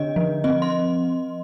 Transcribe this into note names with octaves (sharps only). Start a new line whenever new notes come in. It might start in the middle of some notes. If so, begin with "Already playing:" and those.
Already playing: D3 D4 D#5
F3
C4 D#5
C6